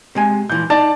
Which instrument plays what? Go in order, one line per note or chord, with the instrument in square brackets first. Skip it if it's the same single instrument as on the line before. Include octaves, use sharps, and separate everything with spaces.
[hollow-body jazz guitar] C3 G#3 G#5
[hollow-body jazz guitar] A#2 E3 F3 [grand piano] G6
[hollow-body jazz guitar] D#4 [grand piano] D5 A5 A6